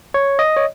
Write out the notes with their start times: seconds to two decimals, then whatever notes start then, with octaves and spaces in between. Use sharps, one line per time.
0.14 C#5
0.39 D#5
0.57 C#5